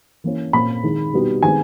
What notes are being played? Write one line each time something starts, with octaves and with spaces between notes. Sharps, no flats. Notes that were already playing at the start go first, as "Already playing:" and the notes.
E3 A#3 C#4
A#2 A#3 C#4 B5
D#3 G#3 D#4
B2 G3 B3 D#4
D#3 G#3 B3 D#4 G#5